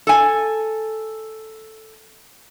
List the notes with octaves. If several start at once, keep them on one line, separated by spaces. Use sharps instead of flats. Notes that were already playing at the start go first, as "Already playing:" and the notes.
A4 G#5